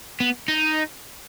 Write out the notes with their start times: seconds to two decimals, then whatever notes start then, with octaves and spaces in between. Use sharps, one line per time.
0.20 B3
0.48 D#4